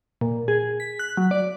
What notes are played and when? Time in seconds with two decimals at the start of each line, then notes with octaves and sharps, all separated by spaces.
0.21 A#2
0.48 G#4
0.80 B6
0.99 F#6
1.17 F#3
1.31 D5